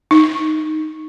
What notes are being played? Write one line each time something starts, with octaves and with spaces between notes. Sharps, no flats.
D#4